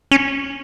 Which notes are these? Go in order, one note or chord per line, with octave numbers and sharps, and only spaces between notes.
C#4